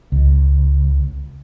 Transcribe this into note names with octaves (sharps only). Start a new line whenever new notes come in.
C#2